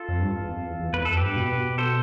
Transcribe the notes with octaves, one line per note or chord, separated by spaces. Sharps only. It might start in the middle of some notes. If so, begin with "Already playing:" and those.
Already playing: F4 A4
F2
G2
E2
F2
E2
E2
E2 B4
F2 A4
G2 G4 B4
B2
A4 C5